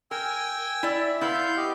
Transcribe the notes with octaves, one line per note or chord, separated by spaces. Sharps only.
A#4 G5 G#5 E6
E4 D5
E5
B3 E4 F5 C6 G6
G4 D#5